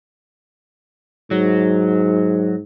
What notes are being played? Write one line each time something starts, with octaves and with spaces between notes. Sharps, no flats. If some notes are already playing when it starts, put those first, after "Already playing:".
G#2 F#3